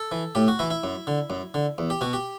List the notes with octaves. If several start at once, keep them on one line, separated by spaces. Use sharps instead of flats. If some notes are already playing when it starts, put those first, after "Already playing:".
Already playing: A4
E3
A2 G4
F#4
E3 E4
E4
F#2
D3
F#2
D3
E2
G4
B2 F#4
G4